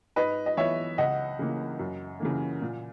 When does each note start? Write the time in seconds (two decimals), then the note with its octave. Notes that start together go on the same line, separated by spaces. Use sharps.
0.16 G#2 B4 D#5
0.46 D#5
0.57 E3 B3 C#5 E5
0.98 C#2 D#5 F#5
1.39 C#3 E3 A#3
1.79 F#2
2.20 C#3 E3 A#3
2.62 A#2